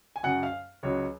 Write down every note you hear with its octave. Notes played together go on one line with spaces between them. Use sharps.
G#5
F#2 C#3 F#3 F#5
F5
C#2 C#3 F#3 C#5